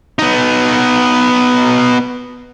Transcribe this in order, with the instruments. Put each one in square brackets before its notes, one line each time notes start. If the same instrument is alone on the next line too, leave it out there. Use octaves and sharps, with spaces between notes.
[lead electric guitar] B3 D#4